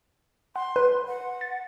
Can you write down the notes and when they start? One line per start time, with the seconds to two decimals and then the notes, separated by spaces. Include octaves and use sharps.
0.56 F#5 C6
0.76 B4
1.08 F#5
1.41 A6